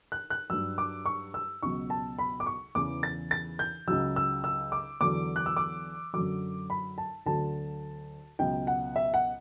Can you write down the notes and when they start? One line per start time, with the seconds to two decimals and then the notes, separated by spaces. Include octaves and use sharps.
0.12 F#6
0.30 F#6
0.50 G2 F#3 E6
0.78 D6
1.06 C#6
1.34 E6
1.63 C#2 B2 F#3 C#6
1.90 A5
2.19 B5
2.40 D6
2.46 C#6
2.75 E2 C#3 E3 D6
3.03 A6
3.31 A6
3.59 G6
3.88 C#2 C#3 F#3 E6
4.16 E6
4.44 E6
4.72 D6
5.00 E2 D3 F#3 D6
5.36 F#6
5.46 E6
5.57 D6
6.13 F#2 D3 F#3 D6
6.70 B5
6.98 A5
7.26 D2 D3 F#3 A5
8.39 C#2 B2 F#3 G5
8.67 F#5
8.96 E5
9.14 F#5